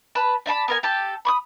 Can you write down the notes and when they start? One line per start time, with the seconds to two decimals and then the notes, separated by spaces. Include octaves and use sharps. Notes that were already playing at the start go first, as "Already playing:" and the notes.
0.15 B4 A5 B5
0.46 D5 E5 A5 B5
0.68 B3 A#4 G#5
0.83 G4 A4 A5
1.25 B5 C#6 D#6